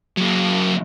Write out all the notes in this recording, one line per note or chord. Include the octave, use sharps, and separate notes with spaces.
F#3 A#3